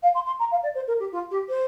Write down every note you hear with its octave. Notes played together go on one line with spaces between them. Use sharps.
F5
C6
C6
A#5
F5
D5
C5
A#4
G4
F4
G4
C5